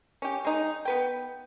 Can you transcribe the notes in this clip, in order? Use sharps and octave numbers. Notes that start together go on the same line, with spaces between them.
C#4 G4
G#3 D#4
B3 B4 G5